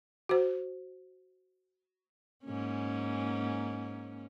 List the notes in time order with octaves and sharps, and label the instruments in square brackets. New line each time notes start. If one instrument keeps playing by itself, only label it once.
[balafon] F#4 C5
[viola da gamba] G#2 A#3 C#4